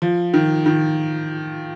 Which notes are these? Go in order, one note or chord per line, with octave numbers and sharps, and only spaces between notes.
F3
D#3
D#3